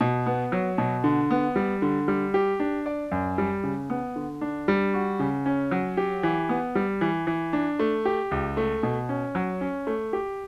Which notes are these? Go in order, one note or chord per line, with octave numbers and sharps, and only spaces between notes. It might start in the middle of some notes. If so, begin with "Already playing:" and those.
B2
B3
F#3
B2
D3
B3
G3
D3
G3
G4
D4
D5
F#2
G3
C#3
B3
D3
D4
G3
F#4
C#3
C#4
F#3
G4
E3
B3
G3
E3
E3
D4
A3
G4
C#2
A3
B2
C#4
F#3
C#4
A3
G4